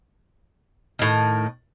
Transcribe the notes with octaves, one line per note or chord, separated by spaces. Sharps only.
A2 D#3